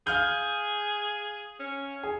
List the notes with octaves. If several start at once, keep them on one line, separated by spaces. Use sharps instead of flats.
G#4 F5 F6 G6
C#4
G#4